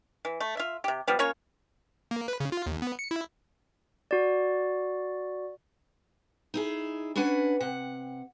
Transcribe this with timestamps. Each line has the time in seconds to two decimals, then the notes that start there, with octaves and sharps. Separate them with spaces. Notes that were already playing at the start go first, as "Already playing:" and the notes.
0.25 E3
0.40 A3
0.57 F4 E5
0.84 C3 G4
1.07 F3 G3 B3
1.19 A#3 C#4 F4 C#5
2.11 A#3
2.28 B4
2.40 C#3
2.52 F4
2.66 D#2
2.82 B3
2.99 C#7
3.11 E4
4.11 F#4 D5
6.54 D#4 E4 G#4
7.16 C#4 D4 B4 F#5 G#5
7.60 C3 F#5